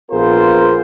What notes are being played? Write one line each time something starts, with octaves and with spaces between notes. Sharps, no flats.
A#1 B3 F4 G#4 A#4 C5